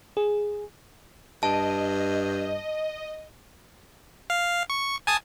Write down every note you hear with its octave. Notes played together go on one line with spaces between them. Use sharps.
G#4
G2 D#5 A5
F5
C#6
G#5 A5 D#6